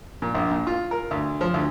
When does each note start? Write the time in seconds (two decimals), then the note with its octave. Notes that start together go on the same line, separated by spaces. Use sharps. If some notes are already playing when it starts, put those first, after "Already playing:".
0.22 A#2
0.34 A#1
0.51 A#2
0.67 F4
0.91 A#4
1.11 D2
1.41 F3
1.54 D2